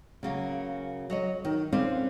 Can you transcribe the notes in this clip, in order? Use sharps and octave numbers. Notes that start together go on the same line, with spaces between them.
C#3 F#3 A#3
F#3 C#5 D#5
D#3
C4 C#4 F4 B4 C5 D5